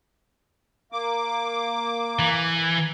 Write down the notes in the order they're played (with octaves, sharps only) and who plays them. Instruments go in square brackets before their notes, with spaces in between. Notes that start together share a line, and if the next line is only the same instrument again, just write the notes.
[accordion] A#3 D6
[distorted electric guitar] E3